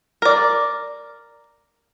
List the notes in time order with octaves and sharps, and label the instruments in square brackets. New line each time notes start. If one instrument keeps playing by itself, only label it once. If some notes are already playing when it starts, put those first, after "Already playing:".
[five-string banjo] A#4 D5